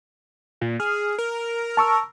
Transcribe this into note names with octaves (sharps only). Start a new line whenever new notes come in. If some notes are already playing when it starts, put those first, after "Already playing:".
A#2
G#4 F6
A#4
A5 C#6 E6